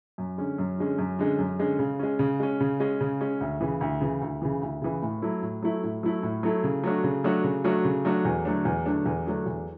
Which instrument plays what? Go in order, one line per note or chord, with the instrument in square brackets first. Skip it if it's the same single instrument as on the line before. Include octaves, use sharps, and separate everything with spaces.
[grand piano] F#2
D3 G#3 C#4
F#2
D3 G#3 C#4
F#2
D3 G#3 C#4
F#2
D3 G#3 C#4
C#3
G#3 C#4
C#3
G#3 C#4
C#3
G#3 C#4
C#3
G#3 C#4
D2
C#3 E3
D2
C#3 E3
D2
C#3 E3
D2
C#3 E3
A2
F#3 A3 E4 A4
A2
F#3 A3 E4 A4
A2
F#3 A3 E4 A4
A2
F#3 A3 E4 A4
C#3
F#3 A3 D4 F#4
C#3
F#3 A3 D4 F#4
C#3
F#3 A3 D4 F#4
C#3
F#3 A3 D4 F#4
E2
D3 F#3 A3 D4
E2
D3 F#3 A3 D4
E2
D3 F#3 A3 D4
E2